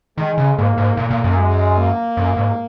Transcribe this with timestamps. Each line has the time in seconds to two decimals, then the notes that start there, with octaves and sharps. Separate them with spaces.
0.18 D#3 G#3
0.38 C#3
0.58 G#2 A#3
0.78 G#2
0.97 A#2
1.10 A#2
1.24 F#2
1.38 G#3
1.77 A#3
2.17 F#2
2.37 G#2